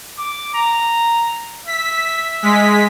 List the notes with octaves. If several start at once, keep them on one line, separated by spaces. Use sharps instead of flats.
D6
A#5
E5 B6
G#3 B6